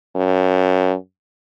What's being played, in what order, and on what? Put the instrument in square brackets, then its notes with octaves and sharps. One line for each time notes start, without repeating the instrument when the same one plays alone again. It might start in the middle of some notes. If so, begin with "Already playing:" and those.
[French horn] F#2